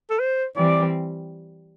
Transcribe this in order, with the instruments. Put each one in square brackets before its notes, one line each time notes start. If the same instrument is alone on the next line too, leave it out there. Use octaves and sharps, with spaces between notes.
[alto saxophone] A4
C5
[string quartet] E3 G3 C4 [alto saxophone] D5